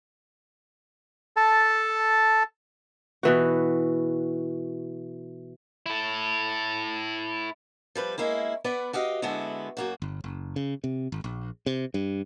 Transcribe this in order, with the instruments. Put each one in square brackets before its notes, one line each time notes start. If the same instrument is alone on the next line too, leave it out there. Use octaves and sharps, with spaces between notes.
[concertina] A4 A5
[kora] B2 E3 F#4
[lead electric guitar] E4 A4
[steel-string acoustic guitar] F3 G3 B4
G#3 A#3 C#4 E4
B3 B4 D5 F#5
F#4 G4 D#5 F5
D3 G#3 B3 E4 F#4
F#2 A#3 F#4
[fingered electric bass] G1
F#1
C#3
C3
G#1
A#1
C3
G2